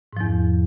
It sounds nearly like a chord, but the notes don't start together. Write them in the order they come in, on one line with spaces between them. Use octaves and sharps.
G#2 F3 E2